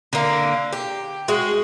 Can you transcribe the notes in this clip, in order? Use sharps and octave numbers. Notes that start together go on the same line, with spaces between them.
D3 A#3
G4
G#3 F#4